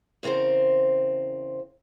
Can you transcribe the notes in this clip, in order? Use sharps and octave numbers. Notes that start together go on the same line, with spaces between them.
E2 C#3 C4 A#4 C5